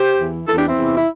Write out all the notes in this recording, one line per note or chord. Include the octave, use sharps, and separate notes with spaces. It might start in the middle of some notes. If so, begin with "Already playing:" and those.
Already playing: G4 C5
E2 E3
E2 E3 E4 A4
D4 G4
C4 E4
E2 C3 E3
E4